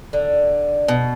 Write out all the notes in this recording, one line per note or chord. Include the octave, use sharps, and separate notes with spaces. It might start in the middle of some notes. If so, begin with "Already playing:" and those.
D3
B2